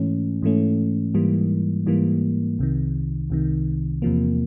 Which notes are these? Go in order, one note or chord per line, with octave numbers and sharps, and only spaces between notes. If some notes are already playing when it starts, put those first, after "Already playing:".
Already playing: G#2 E3 A3 C#4
G#2 E3 A3 C#4
G#2 E3 G3 A#3
G#2 E3 G3 A#3
C2 C3 D#3
C2 C3 D#3
E2 C3 F3 A#3